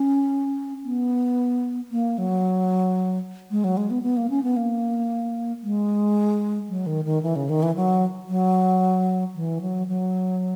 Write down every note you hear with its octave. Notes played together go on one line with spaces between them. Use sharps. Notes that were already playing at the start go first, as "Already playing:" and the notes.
Already playing: C#4
B3
A#3
F#3
G#3
F#3
G#3
B3
B3
A#3
C#4
B3
A#3
G#3
F#3
D#3
D#3
E3
C#3
D#3
E3
F#3
F#3
E3
F#3
F#3